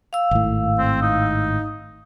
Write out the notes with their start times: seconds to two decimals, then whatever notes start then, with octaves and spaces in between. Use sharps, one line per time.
0.13 F5 E6
0.31 G#1 A2
0.78 C4
1.01 D#4